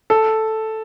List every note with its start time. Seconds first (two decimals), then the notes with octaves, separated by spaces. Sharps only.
0.10 A4